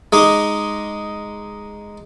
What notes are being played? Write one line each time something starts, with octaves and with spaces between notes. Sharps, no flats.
G#3 D#4 D6